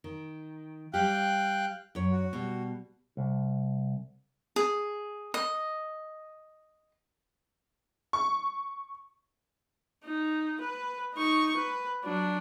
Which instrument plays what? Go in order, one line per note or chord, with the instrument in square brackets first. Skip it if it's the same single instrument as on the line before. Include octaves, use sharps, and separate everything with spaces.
[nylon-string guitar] D#3
[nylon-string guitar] G3 G4 [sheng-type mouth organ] F5 G5 F#6
[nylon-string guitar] F#2 C#5
[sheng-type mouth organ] F#4
[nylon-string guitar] B2 G3
[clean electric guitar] C2
[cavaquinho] G#4
D#5
[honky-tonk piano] C#6
[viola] D#4
B4
D#4 C#6
B4
F#3 D4